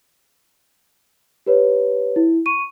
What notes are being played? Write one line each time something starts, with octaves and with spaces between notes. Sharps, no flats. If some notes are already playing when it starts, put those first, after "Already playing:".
G4 B4 C#5
E4
C#6 D#7